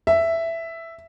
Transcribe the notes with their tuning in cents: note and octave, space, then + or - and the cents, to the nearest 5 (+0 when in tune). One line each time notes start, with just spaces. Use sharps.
E5 +5